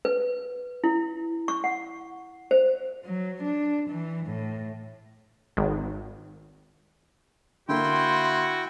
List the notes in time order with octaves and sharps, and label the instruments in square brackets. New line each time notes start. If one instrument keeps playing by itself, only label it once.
[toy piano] B4
E4
C#6
F#5
C5
[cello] F#3
D4
E3
A2
[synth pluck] G#1
[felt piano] D3 A#3 [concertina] E4 G5 [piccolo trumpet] F#4 [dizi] C6